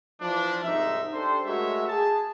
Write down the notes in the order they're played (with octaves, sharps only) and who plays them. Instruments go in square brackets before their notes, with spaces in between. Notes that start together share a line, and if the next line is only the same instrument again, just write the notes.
[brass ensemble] E3 F3 D4
C2 G#2 D#4 E5
D4 G4 A4 C5
G#3 A3 F#4 A#4 C#5 E5
G#4 A5